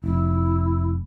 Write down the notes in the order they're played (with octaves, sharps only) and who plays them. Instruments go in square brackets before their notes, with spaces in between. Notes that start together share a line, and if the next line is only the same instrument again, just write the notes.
[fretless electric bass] F1 [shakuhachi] E4